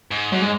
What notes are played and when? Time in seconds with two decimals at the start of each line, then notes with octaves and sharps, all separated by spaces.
0.11 G#2
0.32 G#2 F#3
0.42 G#3